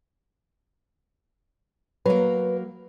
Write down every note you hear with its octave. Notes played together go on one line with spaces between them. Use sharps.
F#3 A#3 B4